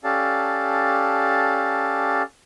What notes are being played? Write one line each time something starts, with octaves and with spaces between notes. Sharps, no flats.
C#4 G4 A4 D5 F5 A5